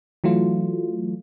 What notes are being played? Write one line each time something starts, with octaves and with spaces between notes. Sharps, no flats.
E3 F#3 A3 F4